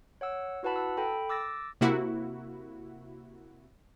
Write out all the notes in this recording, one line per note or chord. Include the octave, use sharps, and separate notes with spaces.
C#5 F#5 E6
E4 F#4 B4 F#5 A5 B5
A5 E6
A4 G5 B5
D6 E6 A6 A#6
C3 A#3 E4 F#4